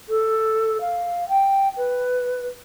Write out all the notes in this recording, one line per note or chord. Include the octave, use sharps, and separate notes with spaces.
A4
F5
G5
B4